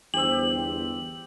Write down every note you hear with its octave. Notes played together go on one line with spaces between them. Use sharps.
G1 E2 G4 C5 E6 F#7